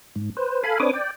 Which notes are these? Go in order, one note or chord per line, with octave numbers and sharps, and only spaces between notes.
G#2
B4 C5
A4 F5 G#5 B5
C4 D4 B4 C#5 D6 D#6
D5 G5